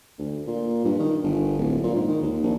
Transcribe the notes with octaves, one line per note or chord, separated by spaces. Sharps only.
D2
A#2
G2
D#3
G1
D1
A#2
G#2
D#3
D#2
A#1